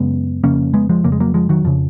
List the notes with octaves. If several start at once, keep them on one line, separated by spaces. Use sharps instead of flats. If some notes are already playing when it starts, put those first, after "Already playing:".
Already playing: F#2 C#3 G#3 B3
F2 C#3 A#3 C#4
G#3 B3
F3 G#3
F2 C#3 A#3
G#3
F#3 A#3
F3 G#3
D#3 F#3
F2 C#3 F3